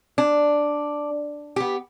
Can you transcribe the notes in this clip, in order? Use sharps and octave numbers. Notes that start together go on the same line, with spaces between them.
D4
B3 G4